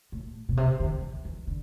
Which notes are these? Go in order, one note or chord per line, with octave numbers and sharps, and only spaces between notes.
A2
B2
C3
D3
E3
E3
D3